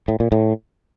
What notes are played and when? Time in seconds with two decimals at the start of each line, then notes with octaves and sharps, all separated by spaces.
0.08 A2
0.20 A#2
0.32 A2